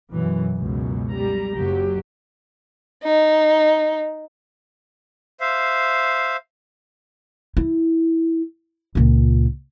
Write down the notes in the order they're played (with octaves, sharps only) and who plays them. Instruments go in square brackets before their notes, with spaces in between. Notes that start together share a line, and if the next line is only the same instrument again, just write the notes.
[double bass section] F#2 B2 E3
C#2 F#2 B2
[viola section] G3 A#5
[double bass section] F#1 F#3 [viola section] G4
[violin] D#4
[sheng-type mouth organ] C5 E5 F5
[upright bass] E4
C#2 A#2